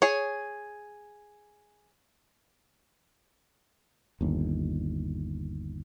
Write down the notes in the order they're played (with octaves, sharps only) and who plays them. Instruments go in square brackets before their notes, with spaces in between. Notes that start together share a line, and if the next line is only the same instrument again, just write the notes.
[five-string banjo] G#4 C#5
[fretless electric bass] G1 D#2